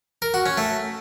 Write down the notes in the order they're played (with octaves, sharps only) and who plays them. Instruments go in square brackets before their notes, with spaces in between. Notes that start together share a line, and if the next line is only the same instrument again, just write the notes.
[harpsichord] A#4
F#4
C#4
A3